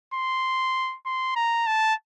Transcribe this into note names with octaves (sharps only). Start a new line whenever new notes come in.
C6
C6
A#5
A5